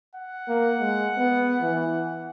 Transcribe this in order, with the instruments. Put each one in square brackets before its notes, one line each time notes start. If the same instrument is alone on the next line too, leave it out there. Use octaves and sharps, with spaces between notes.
[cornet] F#5
[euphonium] A#3
G#3
B3
E3